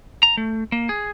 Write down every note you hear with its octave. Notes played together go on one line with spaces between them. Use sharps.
A#5
A3
A#3
G#4